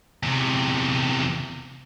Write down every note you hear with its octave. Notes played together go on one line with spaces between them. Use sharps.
E2 C3